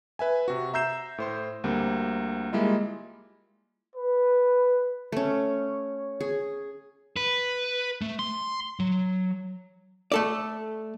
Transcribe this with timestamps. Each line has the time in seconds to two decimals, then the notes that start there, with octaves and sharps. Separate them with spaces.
0.19 B4 E5 G#5
0.48 C3 F#4
0.73 E5 A#5 E6 G6 C7 E7
1.18 A2 C5 C6
1.64 D2 G3 A#3 C4
2.53 G3 G#3 A#3 E4 F4 D#5
3.95 B4
5.12 A3 C#4 C#5
6.20 G#4
7.16 B4
8.01 A3
8.19 C6
8.80 F#3
10.12 A3 A4 D5